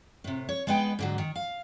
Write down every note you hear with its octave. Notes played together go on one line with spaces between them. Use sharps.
A2 C3
C#5
G#3 B3 D#4 B4 G5
G#2 D3 F#3
D#3
F5